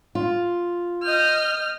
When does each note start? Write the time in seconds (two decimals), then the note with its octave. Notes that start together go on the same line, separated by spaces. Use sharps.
0.15 F4
1.04 D#5 F6 G6